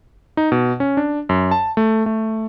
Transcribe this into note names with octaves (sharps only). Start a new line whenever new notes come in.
D#4
B2
C#4
D4
F#2
A5
A3
A3